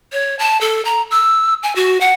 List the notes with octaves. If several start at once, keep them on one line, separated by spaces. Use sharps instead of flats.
C#5
A5
A4
A#5
E6
G#5
F#4
F#5